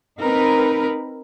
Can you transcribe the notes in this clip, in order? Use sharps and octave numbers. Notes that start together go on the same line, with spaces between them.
C4 D#4 A#4 B4